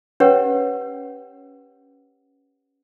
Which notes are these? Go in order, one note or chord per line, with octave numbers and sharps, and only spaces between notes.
C#4 G4 B4 C#5 F#5